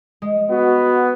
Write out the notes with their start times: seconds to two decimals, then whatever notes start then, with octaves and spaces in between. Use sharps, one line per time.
0.22 G#3
0.51 B3 F#4